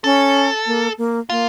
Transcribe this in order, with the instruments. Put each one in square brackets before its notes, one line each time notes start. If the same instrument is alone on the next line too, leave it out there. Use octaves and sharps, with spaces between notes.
[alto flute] C#4 [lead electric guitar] A4
[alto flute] A#3
A#3
[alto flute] A#3 [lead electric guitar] F4